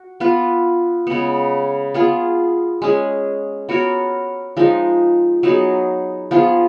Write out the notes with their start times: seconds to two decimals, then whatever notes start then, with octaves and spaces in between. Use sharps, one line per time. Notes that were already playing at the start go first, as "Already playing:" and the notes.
Already playing: F#4
0.20 B3 F4 B4
1.07 C#3 G#3 B3
1.94 B3 F4 G#4
2.82 G#3 C#4 G#4
3.69 B3 F#4 A#4 C#5
4.57 F3 G#3 D#4
5.43 F#3 B3 D#4 G#4
6.31 F3 B3 F4 G#4